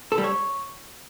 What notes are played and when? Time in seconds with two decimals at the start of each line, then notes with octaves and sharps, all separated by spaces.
0.12 A4
0.18 G3
0.24 C#5